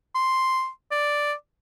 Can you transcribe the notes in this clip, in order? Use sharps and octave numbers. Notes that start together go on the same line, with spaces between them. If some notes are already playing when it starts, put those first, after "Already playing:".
C6
D5